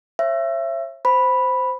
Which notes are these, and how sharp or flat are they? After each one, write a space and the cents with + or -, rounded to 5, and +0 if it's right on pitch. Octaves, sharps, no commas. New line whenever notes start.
C#5 -40 E5 +25
C5 -10 B5 +0